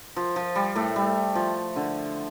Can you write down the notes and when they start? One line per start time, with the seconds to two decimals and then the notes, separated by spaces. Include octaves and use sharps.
0.17 F3
0.36 F3
0.55 G3
0.75 A2 A3
0.96 G3
1.35 F3
1.76 D3